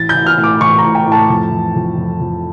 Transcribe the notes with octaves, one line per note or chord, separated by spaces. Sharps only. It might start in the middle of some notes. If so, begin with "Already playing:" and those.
Already playing: A1 A6
G6
A1
F6
A2
D6
A1 C#6
A#5
A2
G5
A2
A5
F2
E3
F2
F2
F2